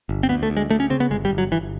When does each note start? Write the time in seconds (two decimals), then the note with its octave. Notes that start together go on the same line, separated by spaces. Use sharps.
0.09 G1
0.23 C4
0.29 D2 B3
0.43 A3
0.50 D2
0.57 G#3
0.70 D2 A3
0.80 C#4
0.90 C#3 C4
1.00 B3
1.10 G1 G#3
1.25 G3
1.31 G1
1.38 F#3
1.51 G1 E3